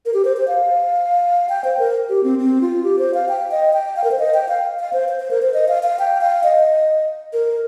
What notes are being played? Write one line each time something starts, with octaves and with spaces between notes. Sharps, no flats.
A#4
G4
C5
C5
F5
G5
C5
A#4
G4
C4
C4
F4
G4
C5
F5
G5
D#5
G5
F5
A#4
C5
D#5
G5
F5
F5
C5
C5
C5
A#4
C5
D#5
F5
F5
G5
F5
D#5
A#4